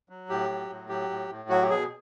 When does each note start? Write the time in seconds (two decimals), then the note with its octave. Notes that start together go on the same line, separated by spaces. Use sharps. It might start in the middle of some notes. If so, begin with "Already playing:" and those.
0.09 F#3
0.29 A2 G4
0.49 F#3
0.70 A2
0.89 F#3 G4
1.09 A2
1.30 A2
1.49 F#3 F#4
1.62 G4
1.69 B2 G#4